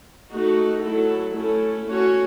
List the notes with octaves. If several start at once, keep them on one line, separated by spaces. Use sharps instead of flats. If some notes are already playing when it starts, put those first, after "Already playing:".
A3 D#4 F#4
F#3 A3 E4 A4
A3 C#4 E4 A4
A3 C#4 F#4 C#5